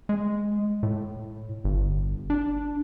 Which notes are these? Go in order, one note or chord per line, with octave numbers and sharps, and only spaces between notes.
G#3
A2
G1
D4